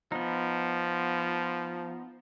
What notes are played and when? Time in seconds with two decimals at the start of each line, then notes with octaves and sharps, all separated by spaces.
0.12 F3 B3 D#4